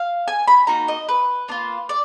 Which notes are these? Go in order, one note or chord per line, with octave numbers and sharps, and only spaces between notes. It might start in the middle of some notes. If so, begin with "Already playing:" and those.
Already playing: F5
G#5
B5
A#3 D#4 F#4 A#5
D#5
B4
A#3 D4 F4
D5